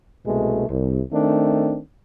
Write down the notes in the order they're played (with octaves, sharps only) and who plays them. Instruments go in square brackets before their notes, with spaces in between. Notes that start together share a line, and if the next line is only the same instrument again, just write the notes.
[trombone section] C2 B2 G#3 A3
C2
D#3 A3 C4 D4